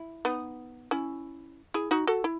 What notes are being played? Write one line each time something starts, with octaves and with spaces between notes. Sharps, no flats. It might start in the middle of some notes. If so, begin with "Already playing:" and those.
Already playing: E4
B3 D#4
C#4 E4
E4 G#4
D#4 F#4
F#4 A4
E4